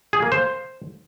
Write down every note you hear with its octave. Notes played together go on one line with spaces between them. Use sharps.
G#4
A#3
C5